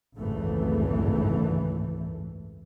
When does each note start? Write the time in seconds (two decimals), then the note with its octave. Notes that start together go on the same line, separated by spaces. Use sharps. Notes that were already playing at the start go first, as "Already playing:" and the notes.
0.18 G#1 C#2 F#2 E3 A3